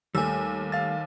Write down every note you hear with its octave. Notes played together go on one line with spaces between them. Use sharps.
D#2 G3 A3 G#5 E6
F5 A6